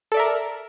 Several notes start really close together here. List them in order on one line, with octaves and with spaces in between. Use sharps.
A4 D5 E5 A#4